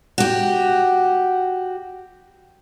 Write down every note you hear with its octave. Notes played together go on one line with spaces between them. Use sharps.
F#4 G4